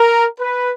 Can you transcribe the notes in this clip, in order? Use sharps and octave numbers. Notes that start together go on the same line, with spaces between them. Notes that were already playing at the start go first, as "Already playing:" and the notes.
Already playing: A#4
B4